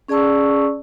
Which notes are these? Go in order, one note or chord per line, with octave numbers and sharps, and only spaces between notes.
C#4 G#4 D5 A5 C#6 E6